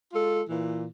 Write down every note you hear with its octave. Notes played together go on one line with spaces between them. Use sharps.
G#3 F4 A4
A#2 E3